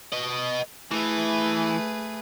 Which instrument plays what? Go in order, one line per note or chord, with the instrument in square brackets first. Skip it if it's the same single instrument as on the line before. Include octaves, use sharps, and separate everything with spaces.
[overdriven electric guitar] B4 D#5
[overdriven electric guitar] E3 [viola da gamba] A3 G#4 B4